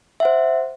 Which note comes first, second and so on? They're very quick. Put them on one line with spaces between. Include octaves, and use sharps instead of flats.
E5 F#5 C5